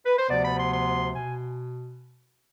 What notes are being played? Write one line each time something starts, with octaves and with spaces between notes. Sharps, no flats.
B4
C5
D2 C3 F3 B3 D5
B5
C6
C6
B2 G#5